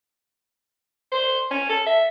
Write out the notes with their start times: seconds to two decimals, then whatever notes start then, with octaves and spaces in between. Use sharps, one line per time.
1.12 C5
1.51 C#4
1.69 A4
1.87 E5